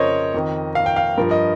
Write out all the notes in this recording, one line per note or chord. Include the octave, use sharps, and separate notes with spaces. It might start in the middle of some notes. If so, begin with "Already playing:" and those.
Already playing: F2 C#3 F3 A#4 C5 C#5 D#5
F2 D#3
F5
G5
F5
G2 F3 A#4
D#5